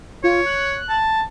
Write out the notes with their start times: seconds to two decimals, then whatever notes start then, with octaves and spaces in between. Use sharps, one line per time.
0.24 F4 C#5
0.46 F#6
0.89 A5